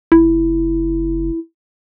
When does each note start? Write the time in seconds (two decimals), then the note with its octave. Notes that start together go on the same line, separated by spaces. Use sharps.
0.12 F#1 E4